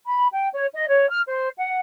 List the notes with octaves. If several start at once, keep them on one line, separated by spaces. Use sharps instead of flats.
B5
G5
C#5
D#5
C#5
F6
C5
F#5